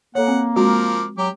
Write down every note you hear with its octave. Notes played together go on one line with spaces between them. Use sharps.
A#3 A4 C#5 F#5
C4 G#5
F3 G#3 C4 F#4 A#4 D6
F#3 G4 D6